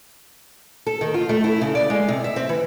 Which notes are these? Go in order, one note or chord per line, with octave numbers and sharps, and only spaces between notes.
A4
D#3
F4
A3
E4
C#3
D5
G#3
C3
E5
C4
E3